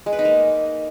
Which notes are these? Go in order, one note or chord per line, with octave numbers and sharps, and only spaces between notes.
G#3
B4
D#4
A#3